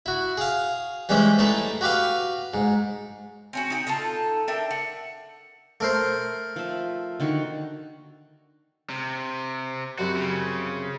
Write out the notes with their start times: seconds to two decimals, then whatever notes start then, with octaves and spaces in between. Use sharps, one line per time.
0.06 E4 F#4
0.37 G#4 F5
1.09 E3 G3 G#3 C#4 C5 E5
1.39 A2 A3 D#4 E4 G#4
1.81 F#4 G4 B4 F5
2.54 G#2
3.53 C4 C#4 F#4
3.70 D#4 G4
3.87 D#4 F4 A4 A5
4.48 D4 A#4 E5 G5
4.71 F#5
5.80 A3 A#4 C5
6.56 F3 E5
7.20 D3 D#3 F#4
8.90 C3
9.99 F#2 C3 G3 F#4
10.16 C#3